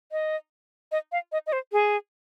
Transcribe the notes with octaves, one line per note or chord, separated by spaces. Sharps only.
D#5
D#5
F5
D#5
D#5
C5
G#4